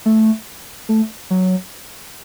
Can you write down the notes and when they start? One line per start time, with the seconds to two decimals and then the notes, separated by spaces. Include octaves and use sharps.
0.06 A3
0.89 A3
1.30 F#3